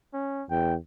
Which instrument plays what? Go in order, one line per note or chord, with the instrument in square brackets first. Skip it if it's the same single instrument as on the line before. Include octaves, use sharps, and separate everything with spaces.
[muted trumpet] C#4
[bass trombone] E2 [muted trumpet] G5